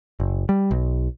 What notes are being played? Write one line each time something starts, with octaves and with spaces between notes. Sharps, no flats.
F#1
G3
B1